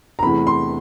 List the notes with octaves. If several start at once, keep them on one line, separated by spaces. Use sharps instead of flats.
A#5
E2 C3 E3 A3 B5
C6